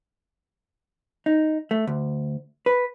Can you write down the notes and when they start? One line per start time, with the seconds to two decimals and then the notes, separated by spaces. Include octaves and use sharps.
1.26 D#4
1.71 A3
1.87 D2
2.66 B4